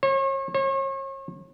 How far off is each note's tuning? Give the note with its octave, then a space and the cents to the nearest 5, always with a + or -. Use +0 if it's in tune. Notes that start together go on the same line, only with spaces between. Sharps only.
C#5 -40
C#5 -40